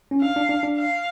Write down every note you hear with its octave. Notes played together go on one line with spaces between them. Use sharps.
C#4
D4 F5
D4
D4
D4
F5